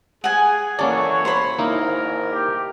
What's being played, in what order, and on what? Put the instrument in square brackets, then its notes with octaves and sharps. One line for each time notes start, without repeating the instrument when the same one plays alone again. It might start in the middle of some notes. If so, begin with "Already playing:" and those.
[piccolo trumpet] G#4 [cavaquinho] F#5 G#5
[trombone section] F#2 E3 F#3 [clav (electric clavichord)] A#3 C#4 D5 [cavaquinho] A4 [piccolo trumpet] C#5
[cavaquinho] C5 B5
[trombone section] G#1 [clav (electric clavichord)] A#3 D#4 E4 [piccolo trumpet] A#4
[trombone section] G4